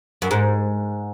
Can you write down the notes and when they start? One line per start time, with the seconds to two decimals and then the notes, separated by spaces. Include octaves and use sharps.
0.22 F#2
0.31 G#2